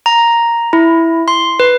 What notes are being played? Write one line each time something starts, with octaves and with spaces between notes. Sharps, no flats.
A#5
E4
C6
B4